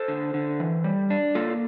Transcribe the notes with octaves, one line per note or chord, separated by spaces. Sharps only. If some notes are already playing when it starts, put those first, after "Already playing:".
Already playing: A4 C5
D3
D3
E3
G3
D4
A#3 F4 A4